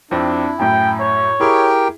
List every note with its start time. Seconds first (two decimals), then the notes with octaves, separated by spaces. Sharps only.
0.11 F2 C4 D4 E4
0.59 F#2 A2 G5
1.01 C#5
1.40 E4 G4 G#4 A#4 G5 B5